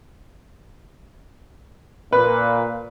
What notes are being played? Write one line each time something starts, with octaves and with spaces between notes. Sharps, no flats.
A#2 B4